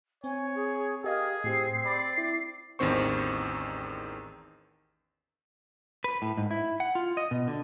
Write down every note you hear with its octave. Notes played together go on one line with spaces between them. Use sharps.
C4 C#5 G#5
G#4
G4 G#4 A#4 D#5 F5
A2 C4 G4 C7
D5 B5
E4
A1 E2 D#3 C4 C5 C#6
B4
A2
G#2
E4
F#5
F4
D#5
B2
D3